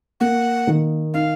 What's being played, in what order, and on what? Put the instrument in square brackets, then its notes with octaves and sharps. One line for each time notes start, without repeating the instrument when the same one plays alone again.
[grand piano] A#3 [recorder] F#5
[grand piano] D#3
[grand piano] D#4 [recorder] F5